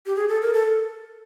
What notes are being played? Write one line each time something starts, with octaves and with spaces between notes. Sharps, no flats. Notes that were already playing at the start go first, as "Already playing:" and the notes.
G4
G#4
A4
A#4
A4